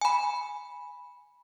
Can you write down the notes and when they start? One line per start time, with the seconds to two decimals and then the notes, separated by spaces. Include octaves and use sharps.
0.01 G#5 B5